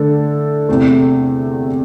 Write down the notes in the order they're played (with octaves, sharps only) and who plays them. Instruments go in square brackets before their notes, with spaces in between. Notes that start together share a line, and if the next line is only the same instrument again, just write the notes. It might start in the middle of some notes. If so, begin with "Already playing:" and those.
Already playing: [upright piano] D3 A3 D4 A4
E2 C3 A3